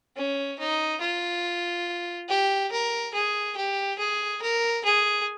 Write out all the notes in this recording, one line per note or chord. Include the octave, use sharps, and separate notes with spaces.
C#4
D#4
F4
G4
A#4
G#4
G4
G#4
A#4
G#4